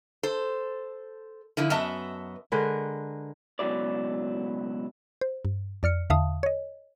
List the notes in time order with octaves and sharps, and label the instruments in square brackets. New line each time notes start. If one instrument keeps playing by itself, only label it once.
[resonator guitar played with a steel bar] A4 C5
D3 F3 E4
F#2 B3 D#5 E5 A5
[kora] D3 G#3 A#4 B4
[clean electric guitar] C#2 B2 E3 F#3 E4 D5
[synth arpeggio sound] C5
G2
F2 D5 F6 C#7
E2 D3 E5 F5 A5 D#6
C#5 D#5